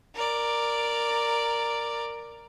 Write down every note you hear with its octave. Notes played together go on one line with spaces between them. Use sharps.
A#4 D5